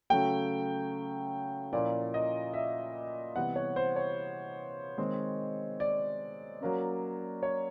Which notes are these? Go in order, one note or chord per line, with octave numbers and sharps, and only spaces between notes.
C#3 F#3 A3 G5
A#2 F3 A#3 C#4 E4 D5
D#5
E5
C3 E3 G3 B3 F#5
C#5
C5
C#5
D#3 G#3 C4
D5
F#3 A#3 C#4
C#5